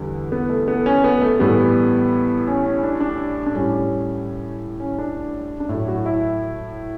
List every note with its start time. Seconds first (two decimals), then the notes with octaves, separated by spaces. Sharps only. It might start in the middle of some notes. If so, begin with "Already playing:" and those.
Already playing: E2 D3 G3
0.32 B3
0.50 A3
0.68 B3
0.86 C#4
1.04 B3
1.21 A3
1.39 A2 E3 G3 B3
2.47 C#4
2.66 C#4
2.83 D4
3.00 D4
3.46 D4
3.55 A2 G3 C#4
4.80 C#4
4.99 D4
5.60 D4
5.69 A2 E4
5.74 F#3
5.88 F#4
6.06 E4